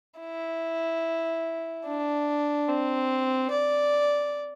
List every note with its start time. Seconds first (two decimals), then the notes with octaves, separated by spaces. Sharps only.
0.20 E4
1.85 D4
2.68 C4
3.51 D5